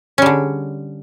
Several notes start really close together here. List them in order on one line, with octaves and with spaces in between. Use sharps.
C#4 G3 D3